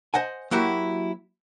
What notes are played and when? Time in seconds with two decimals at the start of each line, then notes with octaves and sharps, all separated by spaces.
0.14 C5 D#5 F#5 G#5
0.51 F#3 A#3 E4 F#4 G4